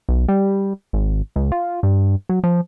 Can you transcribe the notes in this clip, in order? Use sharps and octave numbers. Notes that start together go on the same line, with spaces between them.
B1
G3
G#1
C#2
F4
G2
F#3
F3